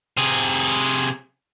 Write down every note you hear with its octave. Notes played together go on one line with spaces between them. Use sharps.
C3 G#4